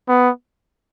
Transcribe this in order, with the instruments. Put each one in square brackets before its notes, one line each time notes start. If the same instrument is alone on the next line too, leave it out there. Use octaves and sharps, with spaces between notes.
[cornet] B3